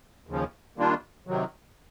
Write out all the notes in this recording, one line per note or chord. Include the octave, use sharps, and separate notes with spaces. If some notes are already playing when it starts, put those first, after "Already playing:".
D#2 C#3 F3
D#3 G3 A#3 D4 F4
C3 D#3 F#3